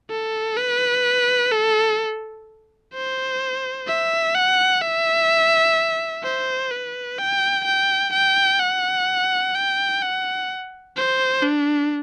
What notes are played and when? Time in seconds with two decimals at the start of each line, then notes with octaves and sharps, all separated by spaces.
0.10 A4
0.57 B4
1.51 A4
2.94 C5
3.88 E5
4.35 F#5
4.82 E5
6.23 C5
6.71 B4
7.18 G5
7.65 G5
8.13 G5
8.60 F#5
9.55 G5
10.02 F#5
10.97 C5
11.43 D4